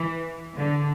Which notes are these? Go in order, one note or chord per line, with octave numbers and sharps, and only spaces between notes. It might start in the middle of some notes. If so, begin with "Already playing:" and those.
Already playing: E3
D3